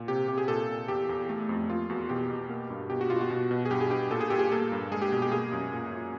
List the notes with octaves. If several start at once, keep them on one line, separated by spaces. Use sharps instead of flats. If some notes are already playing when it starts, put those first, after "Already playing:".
Already playing: A#2
C3 G4
C3 G4
G#4
A#2 A4
A#2
E2 G4
E2
A3
F2
A#3 F4
E2 F#4
B2 G4
B2
A#3
G2
B2 G4
F#4
B2 F4
F#4
B2
B2
G#4
G2 G4
G#4
G2 G4
A#2 A4
G#4
A#2 G4
G#4
A#3 A4
G2
G#3 G#4
G4
B2
G4
A#3 G#4
F#2
A#2
A#2